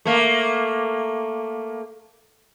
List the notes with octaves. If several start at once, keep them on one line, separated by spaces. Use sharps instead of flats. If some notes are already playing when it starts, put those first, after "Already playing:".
A3 A#3